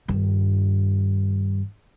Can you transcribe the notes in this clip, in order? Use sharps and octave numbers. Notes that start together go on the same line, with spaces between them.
G2 D#3